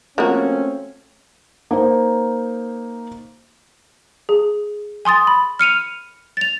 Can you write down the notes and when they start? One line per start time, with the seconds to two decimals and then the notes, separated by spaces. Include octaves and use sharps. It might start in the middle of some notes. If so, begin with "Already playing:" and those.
0.18 F3 A3 A#3 C4 C#4 F#4
1.71 A#3 D#4 C5
4.29 G#4
5.05 G#5 C6 D#6 A6
5.27 B5
5.59 F6 C#7 D#7 F7
6.37 A6 F7